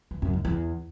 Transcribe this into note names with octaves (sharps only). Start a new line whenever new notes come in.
E3
F#2
D#3
E2